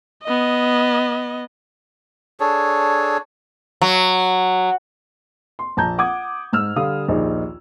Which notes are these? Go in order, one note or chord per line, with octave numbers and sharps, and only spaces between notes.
B3 D#5
D4 G#4 A4 C#5
F#3
C6
A#1 A5 A#5 G6
F#5 D6 D#6 G#6
G#2 E6 F6
D3 G3 F5 D#6
A#1 D#2 D#4 G#4